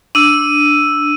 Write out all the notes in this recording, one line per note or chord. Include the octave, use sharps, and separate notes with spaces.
D4 E6 D#7